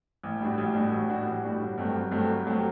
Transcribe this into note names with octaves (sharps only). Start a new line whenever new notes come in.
A1
A2 G3 D4 F#4
A1
A2 G3 D4 F#4
A1
A2 G3 D4 F#4
A1
A2 G3 D4 F#4
G1
G2 F#3 A3 C4
G1
G2 F#3 A3 C4
G1
G2 F#3 A3 C4